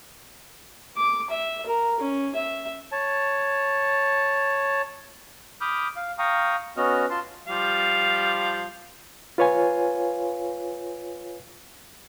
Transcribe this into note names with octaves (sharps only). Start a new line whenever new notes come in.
D6
E5
A#4
C#4
E5
C#5 A5
B5 D6 D#6 F6 G6
F5
F5 G5 A#5 C#6 D#6
B3 C#4 F#4 D#5 F6
F4 A5 C6
F3 G3 F5
F4 B4 C#5 F5 G#5